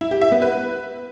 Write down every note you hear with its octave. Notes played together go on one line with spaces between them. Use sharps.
E4
G4
E5
B3
B4